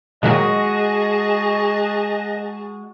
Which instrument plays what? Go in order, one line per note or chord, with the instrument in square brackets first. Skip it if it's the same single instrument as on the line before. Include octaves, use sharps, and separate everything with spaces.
[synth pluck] A#2 D#3 F#3 [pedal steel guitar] G#3 F#4 [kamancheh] G#4 A5 [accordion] D#5